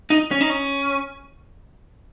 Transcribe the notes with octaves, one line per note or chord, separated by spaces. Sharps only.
D#4
C#4
D#4
C#4